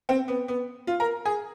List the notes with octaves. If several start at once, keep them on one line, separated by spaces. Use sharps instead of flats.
C4
B3
B3
F4
A#4
G#4